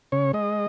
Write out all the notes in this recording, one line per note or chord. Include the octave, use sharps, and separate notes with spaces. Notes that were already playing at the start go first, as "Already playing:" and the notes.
C#3 C#5
G#3 D#5